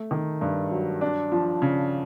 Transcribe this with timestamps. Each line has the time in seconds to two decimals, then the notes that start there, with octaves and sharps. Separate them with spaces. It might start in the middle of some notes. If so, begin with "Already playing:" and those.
Already playing: A3
0.11 D#3
0.41 G2
0.71 F#3
1.01 D4
1.32 F3
1.62 C#3